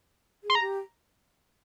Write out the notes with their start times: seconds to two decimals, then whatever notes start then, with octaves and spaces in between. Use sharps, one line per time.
0.44 G#4
0.50 C6
0.55 A#5
0.61 G4